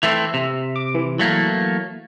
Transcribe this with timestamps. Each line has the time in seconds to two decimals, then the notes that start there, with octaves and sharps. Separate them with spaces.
0.03 E3 A3 C4 E5
0.34 C3
0.76 D6
0.95 E3
1.19 F#3 A3 A#3